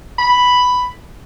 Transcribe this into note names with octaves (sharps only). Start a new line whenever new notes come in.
B5